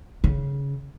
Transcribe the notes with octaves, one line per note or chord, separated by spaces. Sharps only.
C#3